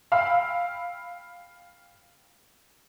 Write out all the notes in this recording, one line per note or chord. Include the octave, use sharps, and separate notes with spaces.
F5 G5 B5 E6 F6